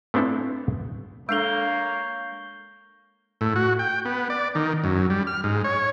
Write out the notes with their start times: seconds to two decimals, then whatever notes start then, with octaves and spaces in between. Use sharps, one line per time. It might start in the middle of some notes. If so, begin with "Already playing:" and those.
0.14 A3 B3 C4 D4 E4 A4
1.29 G#3 A#3 D4 A4 C#5 G6 C7 G7
3.41 A2
3.56 F#4
3.79 G5
4.05 B3
4.30 D5
4.55 D#3
4.84 F#2
5.10 G3
5.27 F6
5.44 G#2
5.64 C#5